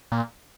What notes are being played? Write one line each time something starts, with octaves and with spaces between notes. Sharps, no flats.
A#2